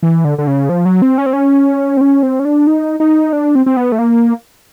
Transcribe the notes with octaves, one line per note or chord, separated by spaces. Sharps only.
E3
D3
D3
C#3
F3
F#3
C4
C#4
C4
C#4
C4
C#4
C4
C#4
D4
D#4
D#4
D4
C4
C4
B3
A3
A#3